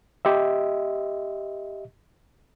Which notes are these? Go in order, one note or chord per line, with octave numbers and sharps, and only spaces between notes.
G4 D#5 E5